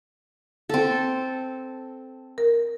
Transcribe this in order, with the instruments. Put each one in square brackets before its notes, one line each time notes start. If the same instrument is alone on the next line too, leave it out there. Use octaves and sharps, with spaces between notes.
[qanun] C4 A4
[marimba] A#4